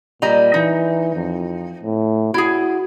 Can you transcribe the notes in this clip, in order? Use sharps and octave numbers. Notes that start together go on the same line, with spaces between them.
A#2 G3 D#5 A#5
E3 D#4
F2
A2
E4 F#4 G#4